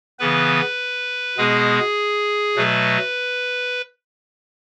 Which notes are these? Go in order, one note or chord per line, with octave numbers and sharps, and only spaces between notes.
C#3 E3 B3 B4
B2 G#3 B3 G#4
B2 F#3 A3 B4